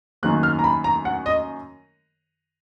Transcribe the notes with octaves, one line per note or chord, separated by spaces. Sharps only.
F#2 D#3 F#3 A#3 F#6
F6
A#5
B5
A#5
F#5
D#5